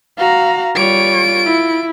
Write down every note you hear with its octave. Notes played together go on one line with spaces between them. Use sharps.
F#4 F5 A#5
G3 F4 C#5 D7
E4